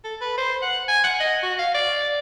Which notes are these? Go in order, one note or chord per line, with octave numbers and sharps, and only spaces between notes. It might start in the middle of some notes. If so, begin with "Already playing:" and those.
A4
B4
C5
F#5
G#5
F#5
D#5
F#4
F5
D5